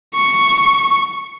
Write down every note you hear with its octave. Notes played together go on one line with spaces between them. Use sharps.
C#6